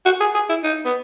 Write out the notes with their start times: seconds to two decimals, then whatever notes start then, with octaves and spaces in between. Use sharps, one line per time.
0.05 F#4
0.20 G#4
0.35 G#4
0.49 E4
0.64 D#4
0.86 B3